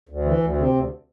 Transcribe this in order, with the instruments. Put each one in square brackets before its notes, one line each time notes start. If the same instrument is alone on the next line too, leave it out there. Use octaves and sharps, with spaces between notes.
[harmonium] D2
E3
D2
C3
D2